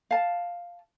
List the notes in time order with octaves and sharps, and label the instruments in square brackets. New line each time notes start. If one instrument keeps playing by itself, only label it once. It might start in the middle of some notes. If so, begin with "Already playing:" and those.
[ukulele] F5 A5